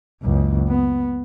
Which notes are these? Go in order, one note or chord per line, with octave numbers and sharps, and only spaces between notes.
F#1 C#2
B3